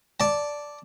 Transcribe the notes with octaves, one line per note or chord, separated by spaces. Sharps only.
D5 A5